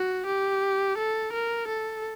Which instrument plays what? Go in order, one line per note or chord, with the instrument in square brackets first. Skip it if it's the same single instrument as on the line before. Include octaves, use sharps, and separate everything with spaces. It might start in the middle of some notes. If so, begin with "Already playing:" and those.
Already playing: [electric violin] F#4
G4
A4
A#4
A4